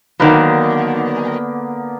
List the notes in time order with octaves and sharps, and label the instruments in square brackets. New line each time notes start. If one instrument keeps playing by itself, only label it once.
[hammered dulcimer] D3 A#3 B3 [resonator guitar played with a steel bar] D#3 F#3